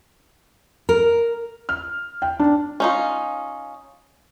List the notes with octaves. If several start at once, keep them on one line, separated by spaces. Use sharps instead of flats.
A#4
F6
G5
D4
C#4 D#4 F4